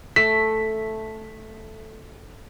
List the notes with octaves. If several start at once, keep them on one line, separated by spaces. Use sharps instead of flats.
A3 B6